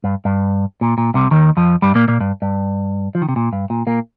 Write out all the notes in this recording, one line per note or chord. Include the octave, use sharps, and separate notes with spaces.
G2
G2
A#2
A#2
C2 C3
D#2 D#3
F2 F3
G2 G3
A#2 A#3
A#2 A#3
G2
G2
F3
D#3
C3
A#2
G2
A#2
A#2 A#3